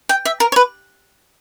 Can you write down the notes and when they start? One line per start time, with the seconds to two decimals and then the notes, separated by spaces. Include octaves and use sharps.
0.09 G5
0.25 E5
0.40 A#4
0.52 C#5
0.56 B4